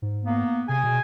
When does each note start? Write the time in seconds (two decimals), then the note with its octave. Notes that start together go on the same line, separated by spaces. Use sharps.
0.02 G#2
0.24 A#3 B3
0.69 C3 G#4 G#5
0.84 B2